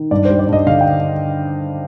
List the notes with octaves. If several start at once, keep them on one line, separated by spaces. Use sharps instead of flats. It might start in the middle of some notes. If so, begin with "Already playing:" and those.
Already playing: D#3
G2 D5
G3 C5
D5
G2 D#5
D3 F5
G5